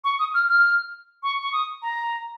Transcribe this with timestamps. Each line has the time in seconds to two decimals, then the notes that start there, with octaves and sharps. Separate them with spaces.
0.04 C#6
0.19 D#6
0.34 F6
0.49 F6
1.23 C#6
1.42 C#6
1.53 D#6
1.82 A#5